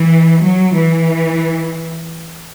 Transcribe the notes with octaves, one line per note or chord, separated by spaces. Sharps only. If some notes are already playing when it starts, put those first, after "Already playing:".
Already playing: E3
F#3
E3